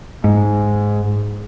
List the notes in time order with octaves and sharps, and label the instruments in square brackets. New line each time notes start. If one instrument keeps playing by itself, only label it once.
[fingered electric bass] G#2